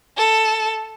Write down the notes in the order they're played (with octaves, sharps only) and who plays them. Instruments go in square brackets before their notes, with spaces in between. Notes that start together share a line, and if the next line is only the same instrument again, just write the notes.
[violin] A4